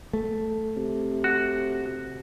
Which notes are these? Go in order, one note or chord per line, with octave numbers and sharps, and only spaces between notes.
A3
C3
F#4